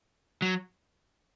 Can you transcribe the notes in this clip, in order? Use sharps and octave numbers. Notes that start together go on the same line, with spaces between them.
F#3